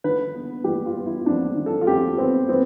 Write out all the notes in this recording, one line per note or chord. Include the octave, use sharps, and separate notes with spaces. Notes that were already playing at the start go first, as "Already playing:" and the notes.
D3 B4
B3
G3 G4
F4
B3
E4
F2 D4
D3
A4
F4
F2 G4
B3 C4
B3 C4